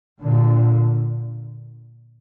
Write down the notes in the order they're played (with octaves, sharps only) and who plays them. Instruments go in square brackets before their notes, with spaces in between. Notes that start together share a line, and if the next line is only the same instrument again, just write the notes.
[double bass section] A#2 D3